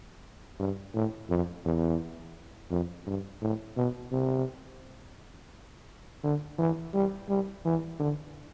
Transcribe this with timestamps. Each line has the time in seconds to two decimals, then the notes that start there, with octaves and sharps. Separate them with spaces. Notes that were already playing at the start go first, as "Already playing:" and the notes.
0.60 G2
0.94 A2
1.30 F2
1.65 E2
2.71 F2
3.07 G2
3.42 A2
3.77 B2
4.12 C3
6.23 D3
6.59 E3
6.94 G3
7.29 G3
7.65 E3
7.99 D3